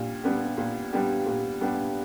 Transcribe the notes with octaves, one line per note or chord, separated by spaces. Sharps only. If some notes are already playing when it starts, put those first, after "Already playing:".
Already playing: A#2 G3 D4 G4
G3 B3 D4 G4
A#2
G3 B3 D4 G4
A#2
G3 B3 D4 G4